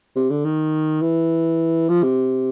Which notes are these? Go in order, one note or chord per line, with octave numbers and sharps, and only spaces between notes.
C3
D3
D#3
E3
F3
C3